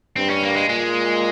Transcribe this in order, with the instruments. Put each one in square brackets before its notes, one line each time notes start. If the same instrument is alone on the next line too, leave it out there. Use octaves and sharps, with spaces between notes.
[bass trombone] G2 [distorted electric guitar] C4
[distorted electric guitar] C#4
A#3
G#3
[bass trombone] A#2 [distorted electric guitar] G#3